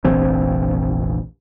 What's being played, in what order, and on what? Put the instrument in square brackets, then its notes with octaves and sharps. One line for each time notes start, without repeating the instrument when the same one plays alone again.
[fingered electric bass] F1 A#1 E3 C4